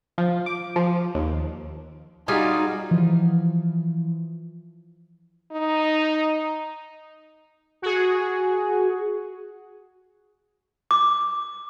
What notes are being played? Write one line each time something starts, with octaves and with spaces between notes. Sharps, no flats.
F3
D6
F3
D#2
G3 D#4 F4 F#4 G#4
E3 F3
D#4
F#4 G#4
D6